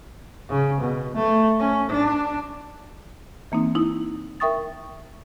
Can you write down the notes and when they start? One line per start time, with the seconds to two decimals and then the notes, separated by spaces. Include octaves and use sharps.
0.49 C#3
0.81 B2
1.14 A3
1.60 C#4
1.90 D4
3.52 E3 A#3 C4 D#4
3.75 D#4 E4
4.40 A#4 E5 G5 C#6 D#6 A6